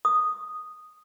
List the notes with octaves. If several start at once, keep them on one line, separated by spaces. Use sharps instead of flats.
D#6